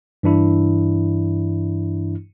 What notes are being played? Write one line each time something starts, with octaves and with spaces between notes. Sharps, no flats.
G2 E3 D4 E4